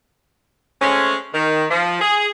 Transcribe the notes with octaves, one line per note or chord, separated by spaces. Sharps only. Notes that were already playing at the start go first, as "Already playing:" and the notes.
G#3 A3 C4 C#4
D#3
F3
G#4